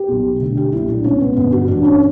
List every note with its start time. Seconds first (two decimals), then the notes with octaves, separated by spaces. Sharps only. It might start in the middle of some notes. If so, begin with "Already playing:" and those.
Already playing: G4
0.08 B1 B2
0.40 D2 D3
0.57 G4
0.72 B1 A#2 E4
0.88 D4
1.04 C#2 B2 C#4
1.21 B3
1.36 G1 G2 D3 B3
1.52 F#4
1.68 G1 G2 E3 D4
1.84 C#4